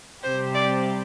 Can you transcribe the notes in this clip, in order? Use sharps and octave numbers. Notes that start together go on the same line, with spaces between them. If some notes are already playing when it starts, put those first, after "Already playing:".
C3 G3 C4 G4 C5
D5